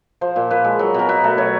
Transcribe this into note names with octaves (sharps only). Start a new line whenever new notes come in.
F3 C5
A#2
A#2 B4
G#3
F#3
B2 A#4
B2 B4
A3
F#3 C#5